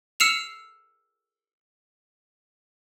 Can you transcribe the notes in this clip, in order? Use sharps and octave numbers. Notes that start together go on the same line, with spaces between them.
E6 F6 C7 C#7 E7 F7